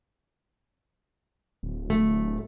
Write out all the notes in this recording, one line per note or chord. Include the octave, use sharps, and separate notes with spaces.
D1
A3